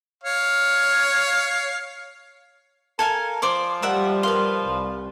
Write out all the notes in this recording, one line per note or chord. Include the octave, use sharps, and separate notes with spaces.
C#5 F5
A4 A#4 F5 G#5 A5 G#6
F3 C5 D5 D6
G3 A#4 E5 F#5
A#4 B4 F5 C6
C2